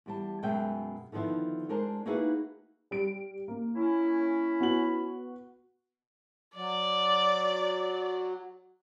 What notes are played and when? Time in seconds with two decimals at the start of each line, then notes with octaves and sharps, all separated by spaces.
0.06 E2 G3 A5
0.43 F#2 B2 G#3 E5 G5
1.12 D3 D#3 F3 B3 E4
1.69 G#3 D4 A#4 C5 A5
2.06 A#3 D#4 E4 F#4 G#4 B4
2.91 G3 D7
3.48 A#3
3.75 C#4 E4
4.60 B3 F#4 F#7
6.55 F#3 D5